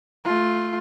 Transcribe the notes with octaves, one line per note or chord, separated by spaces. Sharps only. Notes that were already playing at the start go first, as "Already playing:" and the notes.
A3 F4